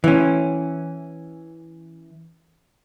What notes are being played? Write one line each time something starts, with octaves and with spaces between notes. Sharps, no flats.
E3 C#4